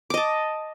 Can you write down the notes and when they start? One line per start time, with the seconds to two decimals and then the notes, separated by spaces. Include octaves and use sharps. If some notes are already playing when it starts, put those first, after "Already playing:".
0.10 D6
0.14 D#5
0.17 A5